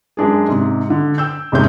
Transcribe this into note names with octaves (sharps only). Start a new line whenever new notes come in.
F#2 G#3 D4 G#4
G#2 C3
D3
G5 E6 G6
E1 C2 G#2 C3 C#4 G6